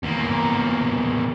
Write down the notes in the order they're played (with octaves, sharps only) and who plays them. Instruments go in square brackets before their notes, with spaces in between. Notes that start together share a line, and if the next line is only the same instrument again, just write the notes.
[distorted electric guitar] E2 A#3